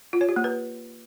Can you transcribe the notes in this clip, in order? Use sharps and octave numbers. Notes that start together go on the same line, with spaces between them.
F4
C#5
G4
A#3
B4